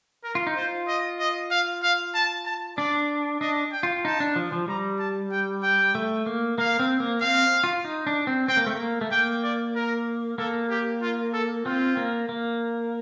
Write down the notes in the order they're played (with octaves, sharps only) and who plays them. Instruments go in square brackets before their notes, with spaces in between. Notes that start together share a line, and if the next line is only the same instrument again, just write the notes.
[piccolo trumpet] A#4
[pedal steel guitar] F4
D#4
[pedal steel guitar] F4 [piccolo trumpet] C5
[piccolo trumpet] D#5
D#5
F5
F5
A5
A5
[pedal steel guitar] D4 [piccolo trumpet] D5
[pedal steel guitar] D4 [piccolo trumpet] D#5
[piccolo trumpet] G5
[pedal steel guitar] F4
[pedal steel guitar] D#4 [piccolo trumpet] A5
[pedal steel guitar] D4
F3
F3
[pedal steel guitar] G3 [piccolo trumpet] A#5
[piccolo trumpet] A5
G5
G5
[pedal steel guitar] A3
A#3
[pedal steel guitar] A#3 [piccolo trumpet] F5
[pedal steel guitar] C4
A#3
[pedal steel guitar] C4 [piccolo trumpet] F5
[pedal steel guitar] F4
D#4
D4
C4
[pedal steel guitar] C4 [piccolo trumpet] G5
[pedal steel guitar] A#3
A3
A#3
A3
[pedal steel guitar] A#3 [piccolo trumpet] G5
[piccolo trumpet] D5
A#4
[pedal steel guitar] A#3 [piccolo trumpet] A4
[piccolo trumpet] G4
F4
A4
[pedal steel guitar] C4 [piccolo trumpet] F4
[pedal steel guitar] A#3
A#3